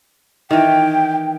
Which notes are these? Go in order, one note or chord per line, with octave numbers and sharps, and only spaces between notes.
D#3 E3 G5